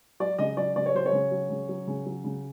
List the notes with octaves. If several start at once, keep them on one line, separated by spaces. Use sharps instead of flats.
F#3 D5
C#3 D#5
F#3 D5
C#3 D5
C#5
F#3 C5
C#5
C#3
F#3
C#3
F#3
C#3
F#3
C#3